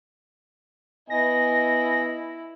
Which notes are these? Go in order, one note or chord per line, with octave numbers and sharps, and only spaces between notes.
B3 E4 D#5 G#5 A#6